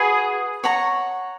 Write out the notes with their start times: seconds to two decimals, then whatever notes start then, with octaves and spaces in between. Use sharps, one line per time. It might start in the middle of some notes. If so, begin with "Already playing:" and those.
Already playing: F#4 G#4 B4
0.64 C#5 F#5 A#5 C#6